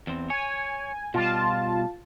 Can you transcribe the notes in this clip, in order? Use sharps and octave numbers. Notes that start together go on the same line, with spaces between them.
E2 C4
C#5 G#5
B2 G3 F4 A5